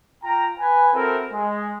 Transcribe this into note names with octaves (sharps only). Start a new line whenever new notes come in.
F4 G5 A#5
B4 G#5
C4 E4 F#4 A4 A#4
G#3